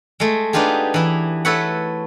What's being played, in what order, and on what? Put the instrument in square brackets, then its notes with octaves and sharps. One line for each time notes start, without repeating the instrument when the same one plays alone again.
[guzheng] G#3 A3
B3 D4 D#4 F4 G4 G#4
E3 E4
A3 A4 B4 C#5 E5 F#5